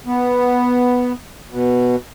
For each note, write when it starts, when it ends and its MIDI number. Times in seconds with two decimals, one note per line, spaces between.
0.06 1.13 59
1.50 1.96 47